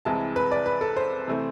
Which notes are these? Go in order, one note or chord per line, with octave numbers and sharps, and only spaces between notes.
C2 C3 E3 G#3 A5
B4
D5
B4
A4
C5
C3 E3 A3